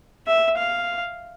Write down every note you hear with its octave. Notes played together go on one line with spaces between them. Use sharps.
E5
F5